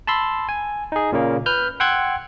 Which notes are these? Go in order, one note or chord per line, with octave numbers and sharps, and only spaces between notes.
A5 B5 C6 E6
G#5
D#4 G#4
A#2 C#3 A#3
B4 F6 G6
F#5 G5 C6 E6 F#6 G#6